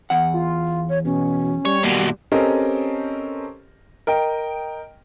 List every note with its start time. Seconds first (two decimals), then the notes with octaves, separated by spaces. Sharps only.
0.10 E2 F#5
0.34 F4
0.89 C#5
1.05 B2 C#4
1.65 G3 C#5
1.84 D#2 B2 A#3
2.32 C4 C#4 G4 A4 A#4 D#5
4.07 A#4 D#5 G5